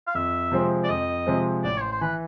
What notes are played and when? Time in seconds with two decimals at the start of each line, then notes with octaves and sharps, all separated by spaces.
0.07 F5
0.15 F2 E5
0.52 C3 F3 G#3 C4
0.84 D5
0.89 F2 D#5
1.27 C3 F3 G#3 C4
1.64 A1 D5
1.77 C#5
1.82 C5
1.92 C5
2.01 E3 B4